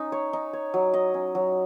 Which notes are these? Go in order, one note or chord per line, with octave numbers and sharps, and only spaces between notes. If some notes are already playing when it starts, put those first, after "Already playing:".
Already playing: C#4 D#4
C#5
D#4
C#5
F#3
D#5
C#4
F#3